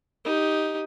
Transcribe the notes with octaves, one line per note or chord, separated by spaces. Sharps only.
D#4 G4